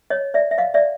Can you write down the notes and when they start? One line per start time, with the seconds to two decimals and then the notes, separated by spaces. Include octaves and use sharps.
0.10 C#5 D#5
0.34 D5 E5
0.51 E5
0.58 D#5 F5
0.74 D5 E5